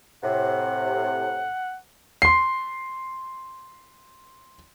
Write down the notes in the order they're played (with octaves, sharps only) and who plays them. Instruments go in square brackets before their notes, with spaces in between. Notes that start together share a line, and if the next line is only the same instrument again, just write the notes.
[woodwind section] A2 C3 [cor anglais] F#5
[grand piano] C6 C7